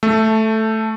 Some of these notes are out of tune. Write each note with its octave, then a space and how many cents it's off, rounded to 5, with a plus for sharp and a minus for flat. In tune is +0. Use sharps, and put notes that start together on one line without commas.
A3 +0 A4 -5